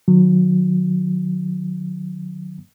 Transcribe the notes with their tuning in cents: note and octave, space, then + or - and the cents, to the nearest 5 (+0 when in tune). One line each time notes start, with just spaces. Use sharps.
D#3 -45 F#3 -25